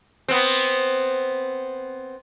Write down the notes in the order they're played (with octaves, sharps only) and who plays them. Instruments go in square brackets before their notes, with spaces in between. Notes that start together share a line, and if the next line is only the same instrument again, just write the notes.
[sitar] B3 C4